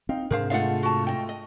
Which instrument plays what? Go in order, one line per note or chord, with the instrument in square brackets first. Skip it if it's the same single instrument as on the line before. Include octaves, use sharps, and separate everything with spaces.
[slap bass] C4 [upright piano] D#4 F5 G5
[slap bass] G#2 C3 D4 [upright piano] G#4 [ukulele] A#4 C5 F5
[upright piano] G#3 A3 F4 [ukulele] F5 F#5
[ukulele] F#4 A5
D#5 G5
D#5